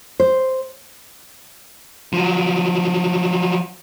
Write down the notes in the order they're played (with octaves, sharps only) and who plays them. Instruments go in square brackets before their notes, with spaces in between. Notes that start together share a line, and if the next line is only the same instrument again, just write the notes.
[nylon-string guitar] C5
[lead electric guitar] F3 F#3